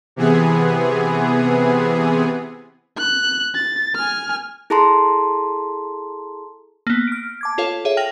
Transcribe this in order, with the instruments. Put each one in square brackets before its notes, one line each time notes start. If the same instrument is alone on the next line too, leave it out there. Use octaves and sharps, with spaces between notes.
[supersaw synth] C3 E3 B3 G#4
[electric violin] F#6
A6
G#5 F6
[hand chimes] E4 G#4 A4 A5 A#5 C6
[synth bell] A#3 B3
F6 D7
A5 D6 G#6
F4 A4 C#5 F5
G#4 C#5 E5
G5 F6 A#6 F7 F#7